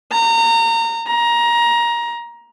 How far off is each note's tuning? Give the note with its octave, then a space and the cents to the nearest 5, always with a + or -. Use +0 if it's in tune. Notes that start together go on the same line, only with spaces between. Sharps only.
A#5 -25
A#5 +20